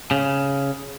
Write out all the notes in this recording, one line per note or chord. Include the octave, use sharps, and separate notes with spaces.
C#3